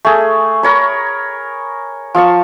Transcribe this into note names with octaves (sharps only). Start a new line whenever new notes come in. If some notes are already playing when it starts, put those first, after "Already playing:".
A3 G#4
A#4 C#5 B5
F3 F5 A5 C#6